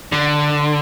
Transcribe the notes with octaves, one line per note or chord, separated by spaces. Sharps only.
D3